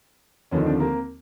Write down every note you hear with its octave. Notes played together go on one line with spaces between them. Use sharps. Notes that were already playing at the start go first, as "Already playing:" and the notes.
D#2 D3 F3 A3 B3 C#4
D#4
C4 D4
A#3 C4